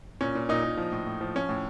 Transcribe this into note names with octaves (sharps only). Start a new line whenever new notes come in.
A#2 C#4
A#2
A#2 D#4
A#2
F3
A2
A2
F3
F3 C#4
A2